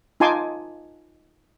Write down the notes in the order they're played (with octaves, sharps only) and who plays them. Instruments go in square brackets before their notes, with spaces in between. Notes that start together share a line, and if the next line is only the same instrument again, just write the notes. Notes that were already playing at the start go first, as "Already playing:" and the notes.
[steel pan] D#4 F4 G#5 A5 C6 D6